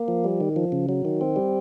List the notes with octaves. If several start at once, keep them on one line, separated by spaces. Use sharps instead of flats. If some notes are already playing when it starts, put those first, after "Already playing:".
Already playing: A#3
F3
G3
D#3
F3
C#3
F#3
D#3
C4
G3